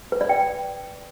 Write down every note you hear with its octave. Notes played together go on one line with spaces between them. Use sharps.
B4
D5
G5